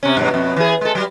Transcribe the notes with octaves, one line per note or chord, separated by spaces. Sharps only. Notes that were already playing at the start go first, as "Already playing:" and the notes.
C3 C#4
G2 B2 F#3
F2 B2
E3 G#4
G#3 A4
F#3 G3